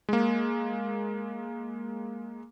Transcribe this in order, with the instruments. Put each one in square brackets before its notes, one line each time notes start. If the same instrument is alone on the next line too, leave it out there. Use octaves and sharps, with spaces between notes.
[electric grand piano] G#3 A#3